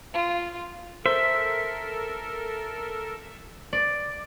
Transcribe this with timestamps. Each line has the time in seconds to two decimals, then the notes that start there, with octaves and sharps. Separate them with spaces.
0.14 F4
1.06 A4 A#4 C5 E5
3.73 D5